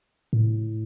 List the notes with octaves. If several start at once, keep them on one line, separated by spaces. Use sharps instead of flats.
A2